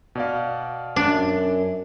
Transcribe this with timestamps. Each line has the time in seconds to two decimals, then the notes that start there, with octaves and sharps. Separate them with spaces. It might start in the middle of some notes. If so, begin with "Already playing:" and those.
0.15 B2 D5 F5
0.96 F#2 D4